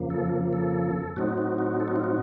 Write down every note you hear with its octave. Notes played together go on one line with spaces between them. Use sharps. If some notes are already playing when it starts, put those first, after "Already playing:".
Already playing: F2 C#3 F3 A#3
A4
A4
A2 F#3 C4 D#4 F#4
F#4
F#4
A4
F#4
F4
F#4